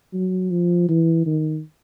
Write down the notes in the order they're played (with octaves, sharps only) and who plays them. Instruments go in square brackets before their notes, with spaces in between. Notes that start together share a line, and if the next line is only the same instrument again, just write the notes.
[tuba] F#3
F3
E3
D#3